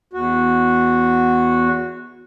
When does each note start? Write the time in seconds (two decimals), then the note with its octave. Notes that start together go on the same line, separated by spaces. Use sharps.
0.13 E2 F#4